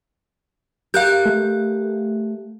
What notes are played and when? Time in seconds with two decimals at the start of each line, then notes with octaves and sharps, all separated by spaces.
0.94 G4 A#4 F5 F#6 G6
1.26 A3